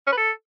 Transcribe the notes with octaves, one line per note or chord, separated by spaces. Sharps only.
C#4
B4
A4